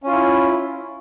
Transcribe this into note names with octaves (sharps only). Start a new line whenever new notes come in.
C#4 E4 F4